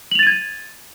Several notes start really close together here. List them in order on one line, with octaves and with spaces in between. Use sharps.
F#7 F7 A6 D#7 G#6